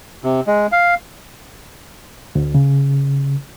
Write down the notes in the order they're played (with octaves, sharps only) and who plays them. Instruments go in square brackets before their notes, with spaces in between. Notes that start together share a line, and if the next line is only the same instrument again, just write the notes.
[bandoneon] C3
G#3
F5
[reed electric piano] D2
C#3